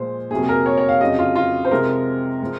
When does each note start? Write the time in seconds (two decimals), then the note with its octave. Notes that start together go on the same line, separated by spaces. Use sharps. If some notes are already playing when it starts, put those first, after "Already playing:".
Already playing: A#2 F3 G#3 C5
0.31 F2 C3 F#3 A#3 G#4
0.43 G#4
0.49 A#4
0.66 C#5
0.78 C#5
0.89 F5
1.00 F2 C#3 F#3 D#5
1.19 F4
1.35 F4
1.65 C5
1.71 C3 F3 G#3 A#4
2.41 F3 G#3